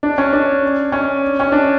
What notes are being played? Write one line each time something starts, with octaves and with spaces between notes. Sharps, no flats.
D4
C#4
D4
C#4
C#4
D4